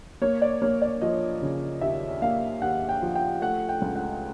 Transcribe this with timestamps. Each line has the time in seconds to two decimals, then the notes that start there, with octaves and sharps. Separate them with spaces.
0.21 A#3 C#5
0.42 D5
0.62 A#3 C#5
0.82 D5
1.02 F3 D#5
1.42 C#3
1.81 D#2 E5
2.22 A#3 F5
2.62 D#2 F#5
2.89 G5
3.02 F3
3.15 G5
3.42 A3 F#5
3.69 G5
3.82 C#2
3.96 F#5